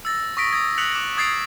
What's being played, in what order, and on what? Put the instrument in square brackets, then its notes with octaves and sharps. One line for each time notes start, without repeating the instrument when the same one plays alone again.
[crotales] E6 A6 A#6
C#6 D#6 A#6 B6 D7
D#6 G#6 A#6
D#6 F#6 B6 C#7 F7 F#7
D6 F#6 A#6
D6 D#6 G#6 A6 C7 D7